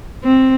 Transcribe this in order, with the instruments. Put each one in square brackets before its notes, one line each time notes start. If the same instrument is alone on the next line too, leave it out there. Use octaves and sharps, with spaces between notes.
[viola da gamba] C4